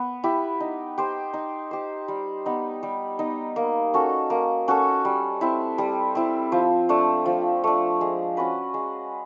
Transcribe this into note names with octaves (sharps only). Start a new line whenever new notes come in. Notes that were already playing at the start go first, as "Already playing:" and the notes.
Already playing: B3
E4 G4
D#4
G4 C5
D#4
G4 C5
G3
B3 D#4
G3
B3 D#4
A#3
C#4 F#4 A4
A#3
C#4 F#4 A4
G3
C4 E4
G3
C4 E4
F3
A3 D4
F3
A3 D4
G#3
C#4 F#4 B4
G#3